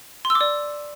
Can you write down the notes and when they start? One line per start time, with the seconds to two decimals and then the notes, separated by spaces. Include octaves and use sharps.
0.25 C6
0.30 E6
0.35 D6
0.41 D5